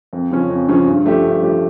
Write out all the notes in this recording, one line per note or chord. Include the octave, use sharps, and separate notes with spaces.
F2
C#3 F3 C#4
F2
C#3 F3 C#4
G2
F3 A3 D4 G4
G2
F3 A3 D4 G4